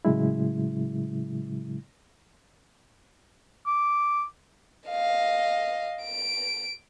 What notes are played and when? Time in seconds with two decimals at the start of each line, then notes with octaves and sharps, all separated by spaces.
0.05 A2 C#3 F#3 G#3 E4
3.67 D6
4.89 D#5 F5
6.04 D7